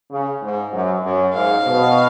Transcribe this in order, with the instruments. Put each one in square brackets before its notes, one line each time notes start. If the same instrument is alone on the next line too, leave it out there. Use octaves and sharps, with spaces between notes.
[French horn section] C#3
G#2
F#2
F#2
[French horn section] G#2 [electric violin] F5
[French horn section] B2